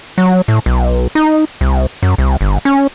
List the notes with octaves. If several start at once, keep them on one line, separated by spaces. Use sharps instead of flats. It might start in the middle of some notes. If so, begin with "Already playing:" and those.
F#3
A2
B1
D#4
C2
F#2
C2
G1
C#4